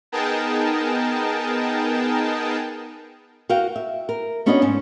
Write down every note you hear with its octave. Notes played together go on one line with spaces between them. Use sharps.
B3 D#4 G#4 A#4 G5 A5
F#4 A#4 F5 G5
E5
A#4
B3 C#4 D4 F#4 C#5 D#5
G#2 C#4